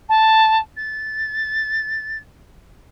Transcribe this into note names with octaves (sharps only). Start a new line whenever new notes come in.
A5
A6